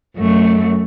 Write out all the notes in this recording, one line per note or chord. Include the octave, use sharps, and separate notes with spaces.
F#2 A3